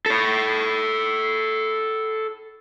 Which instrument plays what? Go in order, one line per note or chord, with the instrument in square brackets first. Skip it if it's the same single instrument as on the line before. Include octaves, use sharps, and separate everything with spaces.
[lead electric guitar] A4 C#5